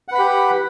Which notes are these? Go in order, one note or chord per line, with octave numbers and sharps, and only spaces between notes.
G4 B4 F#5 B5